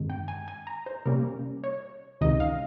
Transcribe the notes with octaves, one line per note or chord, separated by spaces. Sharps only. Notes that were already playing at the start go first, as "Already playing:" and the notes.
Already playing: G2 D#3 G#3 C4
G5
G#5
G#5
A#5
C5
C3 G3 A#3 C#4 A#4
C#5
C#2 C3 D#3 D#5
F5